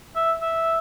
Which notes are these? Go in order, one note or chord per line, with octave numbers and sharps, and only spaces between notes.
E5
E5